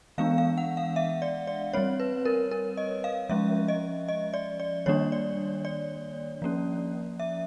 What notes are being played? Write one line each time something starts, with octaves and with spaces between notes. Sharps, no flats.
E3 G#3 B3 D4 F5
F5
F#5
F5
E5
D5
D5
G3 C4 C#5
B4
A#4
A#4
D#5
F5
F3 G#3 C#4 E5
D#5
D#5
D5
D5
D#3 G3 A#3 D4 C#5
D5
D5
F3 A#3 C#4
E5